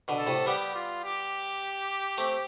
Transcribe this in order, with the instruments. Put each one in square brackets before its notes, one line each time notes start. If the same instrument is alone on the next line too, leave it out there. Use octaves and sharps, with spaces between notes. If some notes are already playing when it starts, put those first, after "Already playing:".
[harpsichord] B2 D3
[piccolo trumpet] A4
[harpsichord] A2 C3
[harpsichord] G3 B3 [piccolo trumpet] G4
[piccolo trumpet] F4
G4
[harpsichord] A3 C4